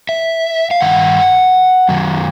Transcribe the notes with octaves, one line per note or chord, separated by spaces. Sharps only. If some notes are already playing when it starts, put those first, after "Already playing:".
E5
F5
G2 D#3 F#5
F#2 D#3 F#3